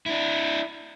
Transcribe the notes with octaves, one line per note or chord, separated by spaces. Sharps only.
D4 E4